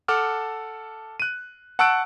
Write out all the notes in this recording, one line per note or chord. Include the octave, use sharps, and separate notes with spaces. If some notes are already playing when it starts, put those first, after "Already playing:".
A4 F#5 A5 D6 F6
F#6 D#7
F#5 A5 C#6 E6 F#6 D7